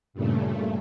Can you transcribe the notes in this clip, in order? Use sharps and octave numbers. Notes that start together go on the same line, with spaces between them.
G2 A#2 C#3 A3